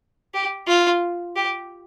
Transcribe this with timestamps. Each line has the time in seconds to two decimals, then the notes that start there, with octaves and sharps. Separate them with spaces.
0.34 G4
0.68 F4
1.36 G4